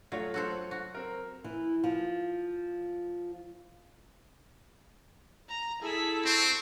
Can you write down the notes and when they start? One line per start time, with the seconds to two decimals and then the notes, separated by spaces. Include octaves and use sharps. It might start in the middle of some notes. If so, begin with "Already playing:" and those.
0.12 F#3 A3 F4 C#5
0.34 F#4 A4 C5
0.71 F#4
0.95 C4 A#4
1.44 E3
1.84 F3
5.49 A#5
5.82 E4 G#4 A4 B6
6.25 C4 C#6